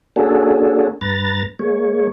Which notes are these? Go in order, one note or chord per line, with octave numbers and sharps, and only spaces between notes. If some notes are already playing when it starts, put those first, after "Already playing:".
A#3 C#4 D4 F#4 G#4 A4
G2 B4 A#5 A6
G#3 A#3 C#5